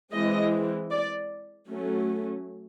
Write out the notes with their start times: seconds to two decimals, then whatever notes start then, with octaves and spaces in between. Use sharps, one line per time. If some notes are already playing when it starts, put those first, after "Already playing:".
0.13 E3 G#3 C4 D#5
0.91 D5
1.68 F#3 A3 C#4